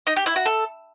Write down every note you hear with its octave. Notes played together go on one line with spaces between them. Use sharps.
D#4
G4
E4
F#4
A4